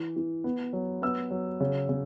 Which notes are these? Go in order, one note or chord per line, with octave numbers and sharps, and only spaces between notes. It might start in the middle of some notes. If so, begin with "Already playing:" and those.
Already playing: E3
E3
B3
F#3
B3 E6
F#3
C#3
C#3